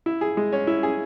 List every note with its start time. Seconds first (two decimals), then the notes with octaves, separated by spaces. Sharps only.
0.06 E4
0.21 G#4
0.37 G#3
0.52 C#4
0.67 E4
0.83 G#4